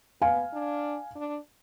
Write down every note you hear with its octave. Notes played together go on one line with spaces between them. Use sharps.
B3 F5 G#5
D4
D4